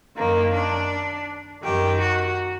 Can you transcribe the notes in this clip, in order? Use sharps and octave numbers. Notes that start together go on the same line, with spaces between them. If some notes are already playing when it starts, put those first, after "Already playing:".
F#2 D#3 A#3
D4
F#2 D#3 G4
F#4